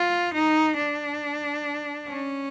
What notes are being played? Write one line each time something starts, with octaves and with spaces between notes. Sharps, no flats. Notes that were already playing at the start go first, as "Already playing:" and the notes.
Already playing: F4
D#4
D4
C#4